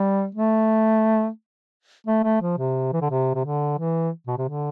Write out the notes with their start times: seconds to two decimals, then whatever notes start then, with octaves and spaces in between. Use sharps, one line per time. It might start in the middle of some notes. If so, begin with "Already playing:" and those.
Already playing: G3
0.35 A3
2.07 A3
2.24 A3
2.41 F3
2.58 C3
2.93 E3
3.02 D3
3.10 C3
3.34 C3
3.45 D3
3.79 E3
4.27 B2
4.38 C3
4.49 D3